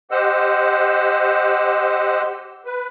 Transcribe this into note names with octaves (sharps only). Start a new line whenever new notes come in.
G4 C5 D#5 F#5 E6
B4